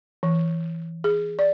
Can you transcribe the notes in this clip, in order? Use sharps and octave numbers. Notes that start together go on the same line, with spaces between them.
E3
G#4
D5